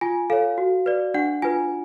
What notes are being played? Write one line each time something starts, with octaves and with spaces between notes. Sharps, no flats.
F4 G#5
A4 C#5 F5
F#4
B4 D5
D4 F#5
F4 B4 G#5